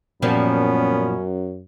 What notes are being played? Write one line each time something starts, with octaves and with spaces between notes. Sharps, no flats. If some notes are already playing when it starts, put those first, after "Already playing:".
F#2 A#2 F3 G3 B3 C#4